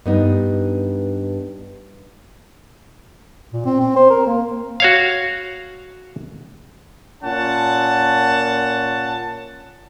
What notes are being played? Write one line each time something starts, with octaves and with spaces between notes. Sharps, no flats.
G2 B3 D#4
A#2
C4
C4
C5
A#4
A#3
F#4 C#5 F5
A#2 C#4 F#5 A5